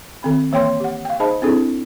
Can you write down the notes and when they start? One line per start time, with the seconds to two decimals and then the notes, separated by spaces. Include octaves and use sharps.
0.23 D#3 C4 B5
0.52 E3 A#3 C#5 G5 C6
0.80 G4 F#5
1.05 F5 G5
1.20 D#4 G#4 C5 D#5 A5 B5
1.42 C4 D4 E4 G#4 A4